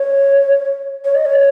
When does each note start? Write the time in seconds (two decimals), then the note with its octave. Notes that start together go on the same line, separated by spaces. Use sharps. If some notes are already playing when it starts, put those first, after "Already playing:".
Already playing: C#5
1.05 C#5
1.15 D#5
1.25 C#5